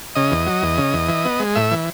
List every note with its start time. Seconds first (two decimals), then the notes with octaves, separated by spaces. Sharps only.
0.15 C#3 D#5
0.31 E2
0.47 F#3
0.62 E2
0.78 C#3
0.93 E2
1.09 E3
1.25 B3
1.40 G#3
1.55 A2 E5
1.71 E3